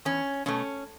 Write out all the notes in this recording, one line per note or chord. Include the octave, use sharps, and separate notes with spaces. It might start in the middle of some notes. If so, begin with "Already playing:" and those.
E2 C#4
B2 A3 C#4